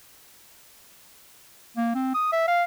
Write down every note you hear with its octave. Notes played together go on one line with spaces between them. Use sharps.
A#3
C4
D#6
E5
F5